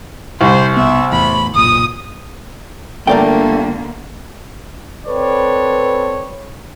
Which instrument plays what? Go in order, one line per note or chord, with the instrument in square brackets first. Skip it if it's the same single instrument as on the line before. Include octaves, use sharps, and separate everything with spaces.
[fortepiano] C2 [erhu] C5
[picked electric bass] B1 B3 [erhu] E5
[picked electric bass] E2 A2 [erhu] B5
[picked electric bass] F#1 B1 A#2 [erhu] D#6
[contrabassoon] G1 [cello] D3 A#3 [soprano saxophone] A3 [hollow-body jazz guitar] A#4 D5 G5
[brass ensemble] C4 A4 B4 C#5 D5